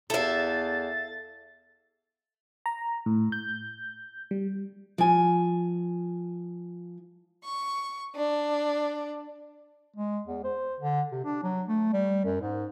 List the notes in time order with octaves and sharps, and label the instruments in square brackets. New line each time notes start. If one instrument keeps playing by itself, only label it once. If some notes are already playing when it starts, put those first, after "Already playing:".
[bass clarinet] E2 [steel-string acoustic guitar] E4 F5 [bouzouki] A4 E5 [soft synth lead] A6
[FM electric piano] A#5
A2
G6
G3
[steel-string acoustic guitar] F3 G#5
[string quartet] C#6
D4
[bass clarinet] G#3
E2
C5
D3
C3
D4
F#3
A3
G3
F#2
G#2